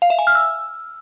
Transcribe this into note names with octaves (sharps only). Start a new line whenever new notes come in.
F5
E5
G#5
F6
E6